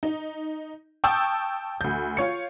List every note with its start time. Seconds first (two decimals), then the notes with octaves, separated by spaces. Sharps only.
0.03 D#4
1.04 G5 A5 C#6 D#6 E6 G6
1.81 D2 G6
2.17 F4 C#5 C#7